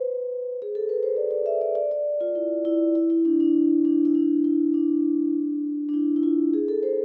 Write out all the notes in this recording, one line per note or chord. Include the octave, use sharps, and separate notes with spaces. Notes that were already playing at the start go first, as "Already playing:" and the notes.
Already playing: B4 C5
G#4
A4
B4
C5
D5
D5
E5
D5
D5
D5
F4
E4
E4
E4
E4
D4
D4
D4
E4
D4
E4
D4
D4
E4
E4
F4
G#4
A4
C5